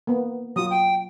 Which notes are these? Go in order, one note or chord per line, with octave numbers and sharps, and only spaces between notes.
A#3 B3
F#3 F4 D#6
G5